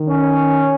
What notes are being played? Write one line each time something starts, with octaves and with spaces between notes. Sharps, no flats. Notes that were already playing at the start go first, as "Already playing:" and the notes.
Already playing: D#3
C#4